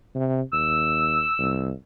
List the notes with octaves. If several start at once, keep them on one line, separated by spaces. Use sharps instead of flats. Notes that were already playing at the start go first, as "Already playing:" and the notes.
C3
D#2 E6
C2